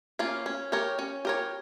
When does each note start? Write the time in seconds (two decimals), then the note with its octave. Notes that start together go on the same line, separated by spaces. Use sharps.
0.19 A#3 C#4 F4
0.46 C#4
0.72 G4 A#4 C#5
0.99 C#4
1.25 G4 A#4 C#5